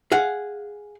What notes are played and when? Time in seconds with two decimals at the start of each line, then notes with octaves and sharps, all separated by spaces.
0.12 G#4 F5 F#5